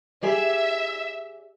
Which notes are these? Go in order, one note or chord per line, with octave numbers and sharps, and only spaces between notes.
G4 G#4 D5 E5